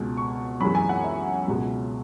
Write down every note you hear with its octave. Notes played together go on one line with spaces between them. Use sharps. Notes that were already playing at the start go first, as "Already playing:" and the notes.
Already playing: C#2 B2 G#3
C#6
F#2 E3 G#3 B5
G#5
F#5
E5
C#2 B2 G#3